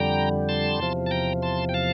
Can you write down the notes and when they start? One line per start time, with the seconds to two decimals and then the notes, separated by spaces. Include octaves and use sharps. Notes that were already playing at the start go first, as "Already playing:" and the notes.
Already playing: F2 D3 G3 G5 A#5
0.49 A5 C6
0.79 E2 C3 F3
1.06 A5
1.11 G5 A#5
1.42 A5 C6
1.69 G5
1.74 F5 A5